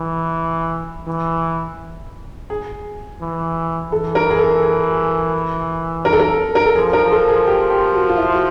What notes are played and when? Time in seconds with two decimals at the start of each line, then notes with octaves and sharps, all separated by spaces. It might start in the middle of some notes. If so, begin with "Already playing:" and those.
Already playing: E3
1.07 E3
2.50 G#4
3.21 E3
3.91 E3 A4
4.15 A#4
4.30 G#4
4.39 A4
4.63 G#4
6.05 A#4
6.13 A4
6.19 A#4
6.55 A#4
6.65 A4
6.76 F3 G#4
6.93 A#4
7.12 A4
7.29 G#4
7.47 G4
7.70 G4
7.95 F#4
8.09 F4
8.17 E4
8.35 F#4